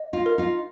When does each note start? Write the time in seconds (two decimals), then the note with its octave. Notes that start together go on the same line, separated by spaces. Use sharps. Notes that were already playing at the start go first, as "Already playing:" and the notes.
Already playing: D#5
0.13 D#4 F4
0.26 A#4
0.38 D#4 F4